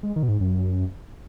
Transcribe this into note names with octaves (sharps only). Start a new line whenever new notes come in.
G#3
D#3
B2
G#2
F#2